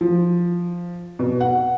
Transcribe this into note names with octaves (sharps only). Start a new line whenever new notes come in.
F3
B2
F#5